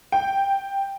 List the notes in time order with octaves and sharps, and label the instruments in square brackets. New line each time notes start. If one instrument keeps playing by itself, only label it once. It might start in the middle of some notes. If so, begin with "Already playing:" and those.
[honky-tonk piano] G5